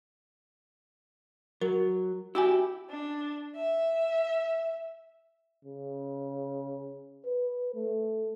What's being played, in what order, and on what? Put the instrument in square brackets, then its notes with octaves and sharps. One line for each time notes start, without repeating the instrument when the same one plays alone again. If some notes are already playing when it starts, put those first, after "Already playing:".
[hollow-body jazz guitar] F#3 [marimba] A#4
[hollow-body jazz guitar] E4 G4 [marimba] F#4 G#5
[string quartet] D4
E5
[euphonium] C#3
B4
A3